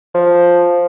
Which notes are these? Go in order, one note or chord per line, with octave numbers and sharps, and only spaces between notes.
F3